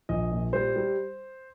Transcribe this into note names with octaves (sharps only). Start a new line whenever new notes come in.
A#1 D#5
A#2
G3 C5
G3